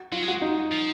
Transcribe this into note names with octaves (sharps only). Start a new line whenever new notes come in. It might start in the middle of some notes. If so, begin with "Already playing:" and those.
Already playing: F#4
F#3 F4
G#3
F#4
D#4
F3